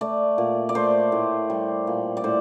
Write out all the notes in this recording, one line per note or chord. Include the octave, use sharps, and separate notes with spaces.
A3 D5
A#2
D5
A3 C5
A2
G3
A#2
D5
A2 C5